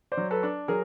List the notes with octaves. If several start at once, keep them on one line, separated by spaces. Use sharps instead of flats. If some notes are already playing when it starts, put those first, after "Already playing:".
C5 D5
F#3
A4 B4
D4
F#3 G#4 A#4